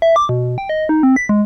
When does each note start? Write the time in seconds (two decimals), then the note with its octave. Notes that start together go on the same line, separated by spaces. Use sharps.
0.02 E5
0.16 D6
0.29 B2
0.58 G5
0.69 D#5
0.89 D#4
1.03 C4
1.16 B6
1.29 G#3